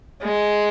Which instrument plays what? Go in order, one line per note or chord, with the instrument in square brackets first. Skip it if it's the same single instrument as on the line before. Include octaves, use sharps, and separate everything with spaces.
[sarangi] G#3